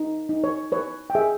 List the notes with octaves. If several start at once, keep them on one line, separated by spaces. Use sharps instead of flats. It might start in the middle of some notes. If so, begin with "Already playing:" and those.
Already playing: D#4
D#4
C#5
B4 C#5
G5
G#4 E5